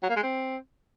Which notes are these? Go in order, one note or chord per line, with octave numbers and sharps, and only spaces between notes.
F#3
A#3
G#3
C4